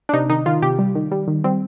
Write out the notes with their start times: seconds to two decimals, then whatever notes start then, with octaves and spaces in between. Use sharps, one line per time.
0.09 D4
0.13 C3 D#4
0.30 D#3 D#4
0.46 D#3 F4
0.62 C3 G4
0.79 G3
0.95 D#3
1.11 G3
1.28 D#3
1.44 G3 C4